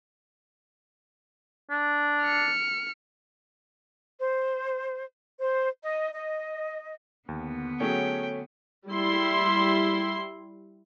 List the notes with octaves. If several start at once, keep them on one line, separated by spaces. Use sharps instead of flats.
D4
F6 C#7
C5
C5
D#5
D#5
D#2 D3 B3
F#3 A3 C#4 G#4 C#5 G5
G3 E4 C6